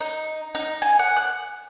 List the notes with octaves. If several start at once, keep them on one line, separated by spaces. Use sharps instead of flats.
D#4
D#4
G#5
F#5
F#6